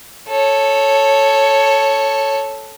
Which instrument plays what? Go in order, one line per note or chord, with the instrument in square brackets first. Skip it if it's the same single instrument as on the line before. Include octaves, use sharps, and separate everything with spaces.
[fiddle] A4 C#5